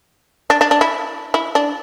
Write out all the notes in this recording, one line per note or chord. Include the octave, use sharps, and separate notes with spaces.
D4
D4
D4
E4
E4
D4